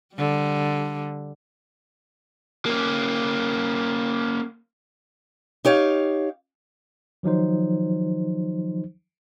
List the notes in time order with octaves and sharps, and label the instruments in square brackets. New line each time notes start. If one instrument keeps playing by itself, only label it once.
[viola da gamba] D3 G3
[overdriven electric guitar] A#3 C#4
[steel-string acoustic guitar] D#4 G4 C#5 F5
[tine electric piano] D#3 F3 F#3 D#4 C5